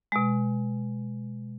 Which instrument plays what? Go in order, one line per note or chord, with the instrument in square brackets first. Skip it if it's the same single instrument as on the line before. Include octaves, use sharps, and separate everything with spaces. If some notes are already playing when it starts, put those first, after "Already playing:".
[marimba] B2 G#3